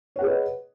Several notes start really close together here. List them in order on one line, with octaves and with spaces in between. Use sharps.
C#5 F#5 G#4 B4 D#5